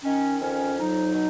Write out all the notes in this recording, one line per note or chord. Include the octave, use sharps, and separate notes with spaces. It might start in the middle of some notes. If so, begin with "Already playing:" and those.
D#3 C#4
F2 C#4
F#3 D#4
B2